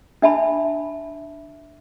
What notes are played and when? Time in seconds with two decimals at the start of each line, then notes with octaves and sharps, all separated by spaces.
0.22 D4 E5 A5 B5